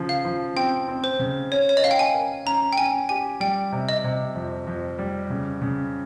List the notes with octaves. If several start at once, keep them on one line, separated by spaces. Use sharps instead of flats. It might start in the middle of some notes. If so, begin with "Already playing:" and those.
Already playing: C#3 F3
F5
F3
C4 G5
C4
C5
C#3
C#4 C#5
C#5
D#5
C#4 F5
G5
G#5
A#4
C#4 A#5
G5
C#4 G#5
G4 G#5
G3 G5
C3
D#5
C3
F2
F2
G3
C#3
C#3